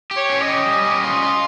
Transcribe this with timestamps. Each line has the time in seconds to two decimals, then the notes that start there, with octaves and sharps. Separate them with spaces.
0.11 G4
0.17 C#5
0.30 C#4
0.41 D#5
0.48 G4
0.66 G3
0.85 C#4
1.03 F4
1.22 F4